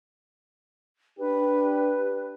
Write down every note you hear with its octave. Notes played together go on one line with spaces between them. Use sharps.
D4 G4 B4